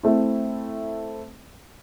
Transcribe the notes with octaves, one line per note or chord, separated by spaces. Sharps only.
A3 C4 E4